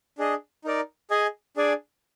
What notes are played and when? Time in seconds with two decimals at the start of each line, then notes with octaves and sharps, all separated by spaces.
0.18 D4 G#4 D#5
0.64 D#4 A#4 D5
1.11 G#4 D#5 G#5
1.57 D4 G#4 D5 G#5